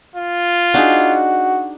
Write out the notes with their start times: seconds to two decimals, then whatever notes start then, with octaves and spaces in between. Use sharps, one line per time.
0.16 F4
0.74 D4 D#4 F#4 G#4